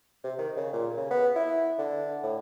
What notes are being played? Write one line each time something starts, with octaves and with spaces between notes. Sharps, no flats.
C3
D#3
C#3
A#2
C#3
B3
E4
D3
A2